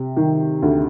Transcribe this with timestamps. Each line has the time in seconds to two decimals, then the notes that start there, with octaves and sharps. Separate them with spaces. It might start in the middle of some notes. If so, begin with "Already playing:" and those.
Already playing: C3
0.17 D#3
0.62 D2